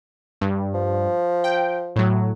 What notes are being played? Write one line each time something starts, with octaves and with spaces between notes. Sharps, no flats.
G2
F3
G5
A2 F#3